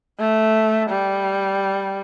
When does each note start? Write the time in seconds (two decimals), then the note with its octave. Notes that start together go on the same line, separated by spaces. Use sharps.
0.19 A3
0.89 G3